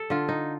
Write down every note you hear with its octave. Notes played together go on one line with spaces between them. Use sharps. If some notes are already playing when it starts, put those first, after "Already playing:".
Already playing: A4
D3 F4
D#4